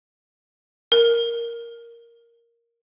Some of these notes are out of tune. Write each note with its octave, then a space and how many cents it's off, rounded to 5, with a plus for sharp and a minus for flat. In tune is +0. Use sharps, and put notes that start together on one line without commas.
A#4 +0